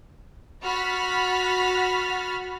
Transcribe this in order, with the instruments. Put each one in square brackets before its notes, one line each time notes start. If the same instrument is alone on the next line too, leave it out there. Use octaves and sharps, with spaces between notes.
[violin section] F#4 B5 F6 A6 B6